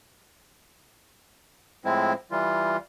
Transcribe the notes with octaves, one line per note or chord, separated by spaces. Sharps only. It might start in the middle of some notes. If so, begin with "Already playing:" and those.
A2 F3 G#3 C4 E4
E3 G3 F4